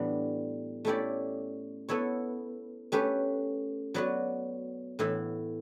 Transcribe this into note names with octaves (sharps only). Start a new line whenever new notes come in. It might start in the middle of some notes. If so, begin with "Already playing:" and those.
Already playing: A2 E3 G3 B3 D4
A3 C#4 E4 G4 D5
B3 E4 A4 C#5
A3 C#4 G4 B4
F#3 B3 F#4 B4 D5
A2 E3 B3 E4